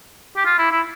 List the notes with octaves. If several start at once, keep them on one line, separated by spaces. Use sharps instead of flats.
G4
F4
E4
E4